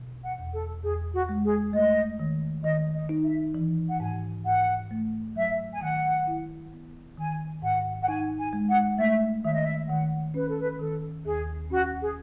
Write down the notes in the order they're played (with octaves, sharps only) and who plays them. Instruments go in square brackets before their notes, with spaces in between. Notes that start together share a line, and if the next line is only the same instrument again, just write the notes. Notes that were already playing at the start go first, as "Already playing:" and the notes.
Already playing: [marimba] B2
[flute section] F#5
[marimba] E2
[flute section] A4
[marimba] E2 [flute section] G#4
[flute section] F#4
[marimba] G#3
[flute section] G#4
[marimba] A3 [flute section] D#5
[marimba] D#3
[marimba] D#3 [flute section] D#5
[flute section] D#5
[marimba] D#4
[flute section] E5
[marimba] E3
[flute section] F#5
[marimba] G#2 [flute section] G#5
[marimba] G#2 [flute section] F#5
[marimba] A3
[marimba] F#3 [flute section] E5
[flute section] G#5
[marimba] D#3 [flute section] F#5
[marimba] E4
B3
[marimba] D#3 [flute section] G#5
[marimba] G#2 [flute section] F#5
[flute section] F#5
[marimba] D#4 [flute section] G#5
[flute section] G#5
[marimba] G#3
[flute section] F#5
[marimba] A3 [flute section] E5
[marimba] D#3 [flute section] E5
[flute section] D#5
E5
[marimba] D#3 [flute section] F#5
[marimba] C#4 [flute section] B4
[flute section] A4
B4
[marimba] D#3 [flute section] A4
[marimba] D#2 [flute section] G#4
[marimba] C#4 [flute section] F#4
[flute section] G#4